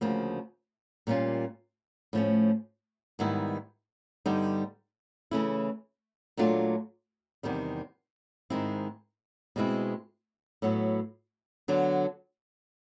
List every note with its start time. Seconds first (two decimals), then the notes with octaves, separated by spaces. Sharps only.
0.01 D2 C#3 F3 A#3
1.07 A#2 G3 A#3 C#4 F4
2.13 A2 F3 A3 C#4
3.19 G#2 D#3 G3 B3 E4
4.26 G2 D3 G3 B3 D#4
5.31 C#3 E3 A3 C#4 E4
6.37 A#2 F#3 A3 D4 F4
7.43 E2 C3 D#3 G3
8.50 G#2 D#3 G#3 C4 E4
9.56 B2 G#3 C4 E4
10.62 A2 F#3 B3 E4
11.68 D3 F#3 B3 D4